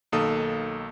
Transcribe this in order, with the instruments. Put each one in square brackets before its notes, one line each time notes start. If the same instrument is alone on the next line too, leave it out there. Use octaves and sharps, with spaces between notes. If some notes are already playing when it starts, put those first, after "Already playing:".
[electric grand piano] B1 D#3 A#3 A4 D#6